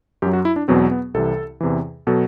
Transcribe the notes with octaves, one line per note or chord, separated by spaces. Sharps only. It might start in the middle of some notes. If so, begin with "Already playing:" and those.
F#2 F#3 G4
F#4
E4
D4
E2 B2 F#3 C4
B3
C2 C3 E3 A4
E2 C3 E3
B2 F#3 A4